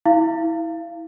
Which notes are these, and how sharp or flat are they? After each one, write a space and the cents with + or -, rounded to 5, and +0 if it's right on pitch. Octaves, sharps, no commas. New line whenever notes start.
E4 -20 F5 -30